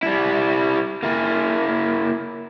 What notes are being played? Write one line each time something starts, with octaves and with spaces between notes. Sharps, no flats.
G3 E4
A#3 E4